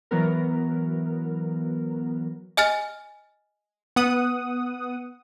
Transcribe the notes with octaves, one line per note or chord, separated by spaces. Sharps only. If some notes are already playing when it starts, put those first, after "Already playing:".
E3 F#3 B3 A#4
D#5 G#5 F6 A6
B3 F#5 D#6